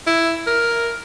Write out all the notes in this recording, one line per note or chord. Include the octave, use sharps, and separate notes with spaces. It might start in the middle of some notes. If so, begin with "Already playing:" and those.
E4
A#4